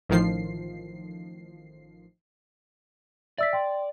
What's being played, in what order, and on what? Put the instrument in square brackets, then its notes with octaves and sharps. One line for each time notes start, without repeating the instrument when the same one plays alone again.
[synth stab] A1 A2 D#3 F3 C7
[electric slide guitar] D5 [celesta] E5 E6 B6
[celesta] G5 C6